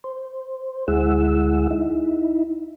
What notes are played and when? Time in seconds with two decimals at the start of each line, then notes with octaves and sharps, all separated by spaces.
0.04 C5
0.88 D2 G#3 E4 G#4 F#5 E6
1.71 D#4 E4